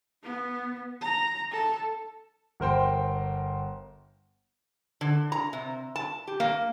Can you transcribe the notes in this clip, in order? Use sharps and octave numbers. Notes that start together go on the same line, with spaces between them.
B3
A#5
A4
G1 A#4 C5 G5 C6
D3
A#5
C3
A5
G4
A#3